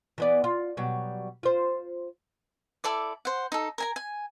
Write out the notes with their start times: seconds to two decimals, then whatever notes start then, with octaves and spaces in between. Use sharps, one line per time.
0.18 E3 B3 D5
0.44 F4
0.77 B2 F#3 G3
1.43 F4 C5
2.84 E4 A4 D5 D6
3.25 C5 F#5
3.52 D#4 A4
3.78 A#4 G#5 A#5
3.96 G#5